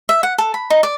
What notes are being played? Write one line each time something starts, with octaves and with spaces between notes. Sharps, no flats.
E5
F#5
A4
B5
D#4
D5